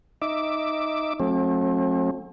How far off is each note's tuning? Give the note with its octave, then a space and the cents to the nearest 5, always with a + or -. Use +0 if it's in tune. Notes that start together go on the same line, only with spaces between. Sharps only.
D#4 +0 E5 +0 D6 +0
F#3 -40 A3 -10 C4 +45